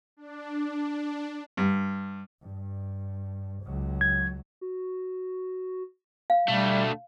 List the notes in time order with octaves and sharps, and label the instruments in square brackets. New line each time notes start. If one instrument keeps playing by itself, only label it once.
[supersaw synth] D4
[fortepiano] G2
[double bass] G2
C#2 F#3
[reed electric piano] G#6
[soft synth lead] F#4
[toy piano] F5
[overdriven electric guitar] D2 A3 [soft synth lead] B2 [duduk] G3